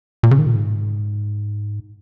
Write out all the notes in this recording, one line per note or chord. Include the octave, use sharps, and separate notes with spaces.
A#2
C#3
D#3
A#2
G#2